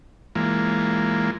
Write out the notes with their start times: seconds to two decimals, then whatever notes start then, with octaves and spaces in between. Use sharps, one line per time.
0.35 E3 G#3 A#3 F4